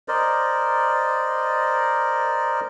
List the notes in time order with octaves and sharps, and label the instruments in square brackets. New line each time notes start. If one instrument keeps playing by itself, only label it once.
[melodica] A#4 C5 D5 D#5